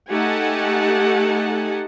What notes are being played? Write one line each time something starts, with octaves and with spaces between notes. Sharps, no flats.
A3 D#4 G4 F#5 G#5 A5